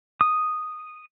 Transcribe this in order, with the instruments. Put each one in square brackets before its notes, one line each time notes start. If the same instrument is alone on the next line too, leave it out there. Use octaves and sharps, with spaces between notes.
[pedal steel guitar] D#6